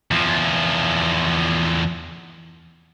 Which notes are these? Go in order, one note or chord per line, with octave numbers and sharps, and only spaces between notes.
E2 F3